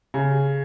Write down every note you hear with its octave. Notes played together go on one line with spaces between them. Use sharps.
C#3